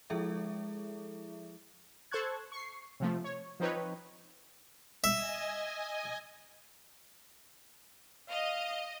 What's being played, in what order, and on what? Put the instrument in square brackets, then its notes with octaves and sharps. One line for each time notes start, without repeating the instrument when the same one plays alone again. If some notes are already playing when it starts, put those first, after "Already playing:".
[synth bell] F3 G#3 E4 G#4 A4 E5
[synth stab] A4 C5 A5 C#6 F#6 G#6
C#6 C7
C3 F3 A3
C#5
F3 C4 D#4 B4 C#5
[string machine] D#5 G#5 [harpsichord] E5
[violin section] D#5 [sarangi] F5